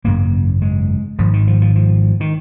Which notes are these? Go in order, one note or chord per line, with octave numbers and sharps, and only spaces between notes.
G#1 F#2 C#3 A#3
G#3
G#1 G#2 F3
D#3
F3
F3
F3
D#3